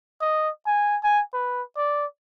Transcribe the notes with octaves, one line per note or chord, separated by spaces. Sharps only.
D#5
G#5
G#5
B4
D5